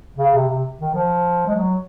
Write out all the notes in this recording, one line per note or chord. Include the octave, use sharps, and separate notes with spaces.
C#3
C3
C3
D#3
F3
G#3
F#3